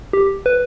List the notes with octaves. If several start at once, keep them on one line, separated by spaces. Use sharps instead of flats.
G4
B4